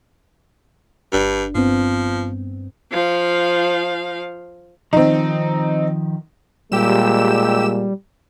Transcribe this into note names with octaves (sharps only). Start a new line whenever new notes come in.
G1 G2 D4
G2 F3 B3 C4
F3 F5
D#3 F3 C4 D#4
A#2 G3 G#3 G4 E6 E7